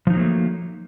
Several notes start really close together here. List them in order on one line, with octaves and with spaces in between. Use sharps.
F3 D#4 F#3 A#3 A3